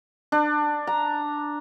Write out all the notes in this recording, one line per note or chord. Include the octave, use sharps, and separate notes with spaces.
D4
A#5